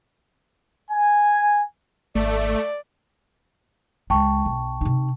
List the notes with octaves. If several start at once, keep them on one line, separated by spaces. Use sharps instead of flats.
G#5
G#1 A3 D5
C#2 G5 A5 C#6
B1
C3 D#4